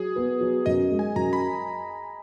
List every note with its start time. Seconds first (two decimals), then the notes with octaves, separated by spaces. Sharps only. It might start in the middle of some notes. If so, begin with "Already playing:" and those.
Already playing: F#3 G#4
0.16 B3
0.41 F#3
0.66 F#2 D#5
0.91 G#3
0.99 G#5
1.16 F#2 A#5
1.33 B5